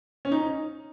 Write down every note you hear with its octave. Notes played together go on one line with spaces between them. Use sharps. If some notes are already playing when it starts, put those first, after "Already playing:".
C#4
D#4